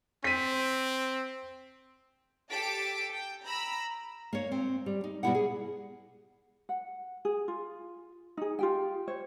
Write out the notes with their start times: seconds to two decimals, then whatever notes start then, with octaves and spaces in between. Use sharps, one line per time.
0.24 C4 B6 D#7
2.51 G4 A4 A5 A6 B6 D7
3.11 G5
3.44 A#5 B5 E6
4.33 A#3 C#5
4.52 C4
4.86 G3
5.04 D#4
5.23 B2 G3 B3 E4 G4 F#5
5.35 G#4
6.69 F#5
7.25 G#4
7.48 F4
8.37 D#4 G#4
8.59 F4 G4 G5
9.07 C5 C#5